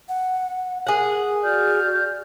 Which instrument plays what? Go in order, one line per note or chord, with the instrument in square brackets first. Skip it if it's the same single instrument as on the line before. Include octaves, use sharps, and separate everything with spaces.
[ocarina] F#5
[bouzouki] G#4 F#5 [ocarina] A#4
[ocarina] F#4 [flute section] D5 F6 G6